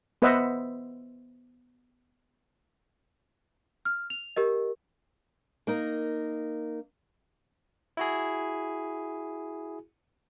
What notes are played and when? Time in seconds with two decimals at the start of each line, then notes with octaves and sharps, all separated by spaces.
0.22 B3 B4 C5 D#5 E5 F#5
3.85 F6
4.10 F7
4.36 G4 A#4 D#5
5.67 A#3 D#4 A#4
7.97 E4 F#4 G#4